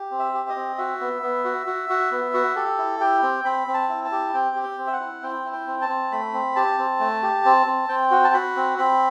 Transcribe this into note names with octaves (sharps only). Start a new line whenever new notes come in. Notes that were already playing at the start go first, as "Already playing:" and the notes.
Already playing: G4
C4
E5
G4
D#5
C4
F#4 E5
B3
B3
F#4
F#4
F#4
B3
F#4
G4 A4
E4
G4 G5
C4
C4 B5
C4
A5
E4
A5
G4
C4 G5
G4
G5
C4
E5
F#5
E4
C4 G5
E4
G5
C4
A5
C4
A3 B5
C4
G4 A5
C4
A3
G4
C4
C4
C4 G5
F#4
A5
F#4 B5
C4
C4 B5